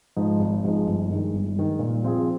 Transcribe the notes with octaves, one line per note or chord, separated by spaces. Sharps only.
G#2 F3 G#3 D#4
G#1
G#2 F3 G#3 D#4
G1
G2 D#3 G#3
G1
G2 D#3 G#3
A#2
F3 C4 F4 G#4